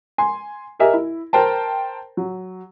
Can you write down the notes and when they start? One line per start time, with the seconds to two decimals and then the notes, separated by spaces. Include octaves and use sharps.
0.18 G#5 C6
0.79 G4 A#4 D#5 E5 G#5
0.94 E4
1.33 A#4 C5 G5 A5
2.17 F#3